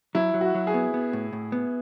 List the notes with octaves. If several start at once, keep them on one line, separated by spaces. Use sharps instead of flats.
F#3 E4
F#3
F#4
F#3
G#4
B3
B3
A2
A2
B3